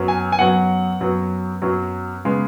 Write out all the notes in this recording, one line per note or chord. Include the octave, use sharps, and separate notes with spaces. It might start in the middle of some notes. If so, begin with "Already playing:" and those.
Already playing: F#2 F#3 B3
G#5
G#5
F#2 F#3 B3 F#5
F#2 F#3 B3
F#2 F#3 B3
C#3 G#3 B3